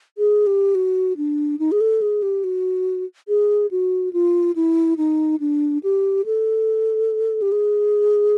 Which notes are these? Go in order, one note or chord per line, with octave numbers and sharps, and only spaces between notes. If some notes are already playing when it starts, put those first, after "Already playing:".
G#4
G4
F#4
D4
D#4
G#4
A4
G#4
G4
F#4
G#4
F#4
F4
E4
D#4
D4
G4
A4
G4
G#4